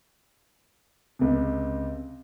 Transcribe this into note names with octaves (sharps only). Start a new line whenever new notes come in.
C#2 C3